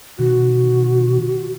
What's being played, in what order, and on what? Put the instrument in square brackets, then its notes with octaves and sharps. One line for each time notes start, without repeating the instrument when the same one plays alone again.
[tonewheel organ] B2 D#3 [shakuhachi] F#4